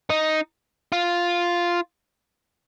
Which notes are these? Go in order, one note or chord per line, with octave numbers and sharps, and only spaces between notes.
D#4
F4